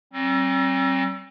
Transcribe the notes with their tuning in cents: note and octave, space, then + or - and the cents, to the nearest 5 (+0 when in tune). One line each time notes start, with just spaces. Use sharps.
G3 -45 C4 +40